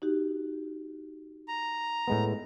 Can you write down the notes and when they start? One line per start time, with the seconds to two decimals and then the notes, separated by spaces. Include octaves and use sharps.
0.02 D#4 F#4 G4
1.48 A#5
2.08 A2 G#3 B3